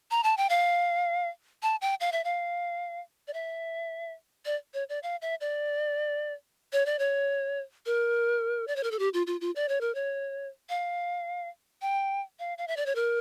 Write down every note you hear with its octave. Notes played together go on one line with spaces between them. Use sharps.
A#5
A5
G5
F5
A5
G5
F5
E5
F5
D5
E5
D5
C#5
D5
F5
E5
D5
C#5
D5
C#5
A#4
D5
C#5
A#4
A4
G4
F4
F4
F4
D5
C#5
A#4
C#5
F5
G5
F5
F5
E5
D5
C#5
A#4